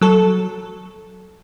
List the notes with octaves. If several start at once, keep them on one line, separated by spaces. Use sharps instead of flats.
F#3 A4